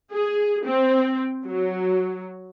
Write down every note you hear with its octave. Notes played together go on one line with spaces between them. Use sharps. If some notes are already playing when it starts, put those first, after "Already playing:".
G#4
C4
F#3